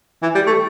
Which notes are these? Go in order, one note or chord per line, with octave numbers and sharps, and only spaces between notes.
E3
G3
A3